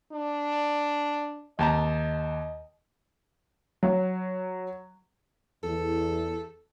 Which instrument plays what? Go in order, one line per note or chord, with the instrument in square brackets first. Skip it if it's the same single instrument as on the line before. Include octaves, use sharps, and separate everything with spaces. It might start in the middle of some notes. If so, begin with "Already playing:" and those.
[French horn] D4
[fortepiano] D#2 A5 A#5 [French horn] D#5
[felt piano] F#3
[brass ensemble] E2 [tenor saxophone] A4